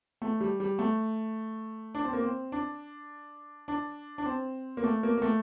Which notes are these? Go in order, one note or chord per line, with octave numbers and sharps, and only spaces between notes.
A3
G3
G3
A3
D4
C4
A#3
C4
D4
D4
D4
C4
A#3
A3
A#3
A#3
A3